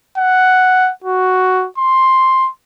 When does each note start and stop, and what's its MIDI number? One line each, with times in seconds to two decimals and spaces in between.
0.18 0.91 78
1.04 1.66 66
1.78 2.49 84